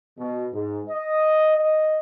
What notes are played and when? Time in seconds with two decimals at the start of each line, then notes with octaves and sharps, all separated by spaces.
0.19 B2
0.53 G#2
0.90 D#5
1.58 D#5